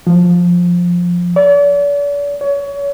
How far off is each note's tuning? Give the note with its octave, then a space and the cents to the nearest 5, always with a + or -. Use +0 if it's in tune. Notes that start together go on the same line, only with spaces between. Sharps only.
F3 +10
D5 -40
C#5 +25